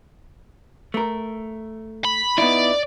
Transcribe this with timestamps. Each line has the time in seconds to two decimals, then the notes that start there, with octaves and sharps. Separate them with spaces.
0.94 A3 A#4
2.05 B5
2.38 B3 D#4 E4 D5